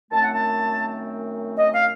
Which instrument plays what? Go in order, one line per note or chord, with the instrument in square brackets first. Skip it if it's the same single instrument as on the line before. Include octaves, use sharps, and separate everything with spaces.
[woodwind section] F#2 D#3 A3 C4 A5
F#5
A5
D#5
F5